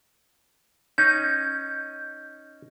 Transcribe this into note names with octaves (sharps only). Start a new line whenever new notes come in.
C#4 D#4 G6